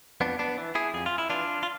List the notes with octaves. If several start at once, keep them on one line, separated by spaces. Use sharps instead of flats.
F2 B3 D4
B3 D4
E3
E4 G#4
F2 G#4
F4
E4
E3 D4 F4
F4